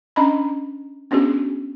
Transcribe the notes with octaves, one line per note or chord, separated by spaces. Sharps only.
C#4 D4 D#5 A#5 B5
B3 C#4 D4 F#4 G#4